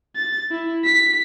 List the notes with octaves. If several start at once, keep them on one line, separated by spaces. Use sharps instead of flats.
A6
E4
B6